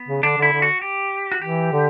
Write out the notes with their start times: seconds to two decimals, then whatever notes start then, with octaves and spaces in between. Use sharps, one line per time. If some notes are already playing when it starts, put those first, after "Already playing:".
Already playing: B3
0.08 C#3
0.23 D3 D4
0.38 D3 E4
0.52 D3
0.62 F#4
0.82 G4
1.32 F#4
1.42 E3 G4
1.72 D3